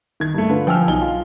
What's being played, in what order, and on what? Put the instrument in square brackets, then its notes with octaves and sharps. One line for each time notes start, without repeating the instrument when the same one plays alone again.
[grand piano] D#3 G#6
G2 A3
D3 F4 B4
F3 G5 G#5 E6 F6
B1 D#4 G#5 G7
F4